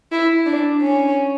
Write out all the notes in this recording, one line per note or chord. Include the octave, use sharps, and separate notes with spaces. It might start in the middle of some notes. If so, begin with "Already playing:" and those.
E4
D4
C#4